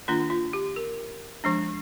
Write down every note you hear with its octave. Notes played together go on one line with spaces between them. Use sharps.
D#3 A#3 D4 F4
F4
G4
A#4
F3 G#3 D4